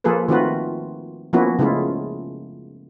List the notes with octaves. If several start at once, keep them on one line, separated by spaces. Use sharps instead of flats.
F3 A#3 F4 G#4 A4 B4
D#3 A3 C4 F4 F#4 B4
F3 A#3 B3 C#4 E4 F#4
C#3 G#3 A3 E4 F4